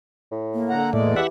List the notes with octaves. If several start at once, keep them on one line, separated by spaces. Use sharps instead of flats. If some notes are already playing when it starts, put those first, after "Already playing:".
A2
A#3
D3 F#5 A#5
E2 A2 G#3 A3 D5
E3 G4 E5 F#5